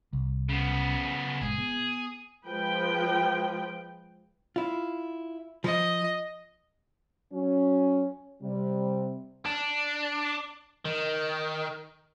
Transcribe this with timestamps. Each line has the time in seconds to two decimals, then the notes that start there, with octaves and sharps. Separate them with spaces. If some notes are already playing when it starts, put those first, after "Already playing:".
0.13 C2
0.49 C#3 B3
1.41 F#1 A#2 G#3 G#4
1.58 B3
2.47 F3 G#3 B4 G5
4.56 E4 F4
5.64 F3 D#5
7.32 F#3 C#4
8.42 C3 G3
9.46 D4
10.85 D#3